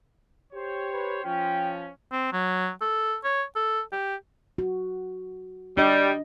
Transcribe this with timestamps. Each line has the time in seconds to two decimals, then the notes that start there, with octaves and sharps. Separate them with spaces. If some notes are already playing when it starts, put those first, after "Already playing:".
0.53 G4 C5 C#5
0.92 B4
1.25 F3 C#4 G5
2.12 C4
2.33 F#3
2.81 A4
3.24 C#5
3.56 A4
3.92 G4
4.58 F#4
5.77 G3 D4 D#5